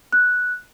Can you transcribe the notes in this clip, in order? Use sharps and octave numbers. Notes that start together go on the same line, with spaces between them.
F#6